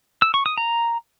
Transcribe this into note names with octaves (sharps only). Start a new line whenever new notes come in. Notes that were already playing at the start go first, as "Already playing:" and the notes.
E6
C#6
D#6
A#5